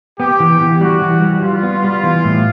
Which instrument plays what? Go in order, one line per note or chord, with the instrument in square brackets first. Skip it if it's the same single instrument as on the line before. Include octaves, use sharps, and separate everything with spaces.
[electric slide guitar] B3 [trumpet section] G4
[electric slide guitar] E3
E3
[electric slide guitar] G3 [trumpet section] F#4
[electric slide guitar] E3
G3
[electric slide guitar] G3 [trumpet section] F4
[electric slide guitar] B3
G3
E3
A2